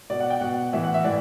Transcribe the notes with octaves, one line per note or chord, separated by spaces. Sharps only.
B2 D5
F#5
G5
B2 F#5
A2 E3 E5
F#5
E5
A2 E3 D5